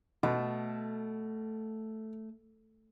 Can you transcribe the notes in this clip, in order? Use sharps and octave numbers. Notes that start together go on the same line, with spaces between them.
B2 A3